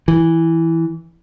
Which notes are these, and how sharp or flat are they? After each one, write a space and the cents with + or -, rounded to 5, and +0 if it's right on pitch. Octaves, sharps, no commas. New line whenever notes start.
E3 -5